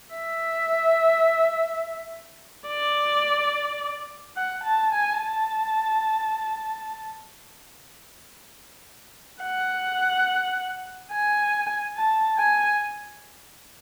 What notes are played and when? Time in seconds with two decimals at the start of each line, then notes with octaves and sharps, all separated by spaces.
0.14 E5
2.67 D5
4.36 F#5
4.64 A5
4.93 G#5
5.20 A5
9.43 F#5
11.12 G#5
11.95 A5
12.38 G#5